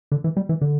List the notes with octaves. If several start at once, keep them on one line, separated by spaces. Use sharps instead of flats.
D3
E3
G3
E3
D3